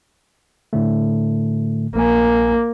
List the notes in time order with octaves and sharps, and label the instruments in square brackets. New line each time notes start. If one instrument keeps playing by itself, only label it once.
[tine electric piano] A2 D3 A3
[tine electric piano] A#1 G#5 [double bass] A#3